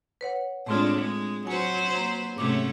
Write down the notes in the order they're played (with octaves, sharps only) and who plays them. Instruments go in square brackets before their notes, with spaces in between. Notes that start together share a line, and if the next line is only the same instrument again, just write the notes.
[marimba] B4 C#5 F#5
[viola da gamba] A2 G#3 D4 [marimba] A3 C4 F4
[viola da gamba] G#3
[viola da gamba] F#3 B4 C5 [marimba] G#5
[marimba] A#3
[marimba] G#2 F#3 D6 [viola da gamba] C3 A3 C#4